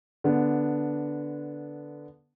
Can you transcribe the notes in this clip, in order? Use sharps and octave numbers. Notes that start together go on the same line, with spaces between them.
D3 B3 D4